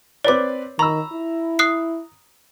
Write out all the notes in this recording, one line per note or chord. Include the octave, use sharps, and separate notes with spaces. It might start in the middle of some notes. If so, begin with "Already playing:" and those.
C4 B4 C#5 D5 D6
D#3 A#5 B5 C#6 E6
E4
D#6 F#6 C7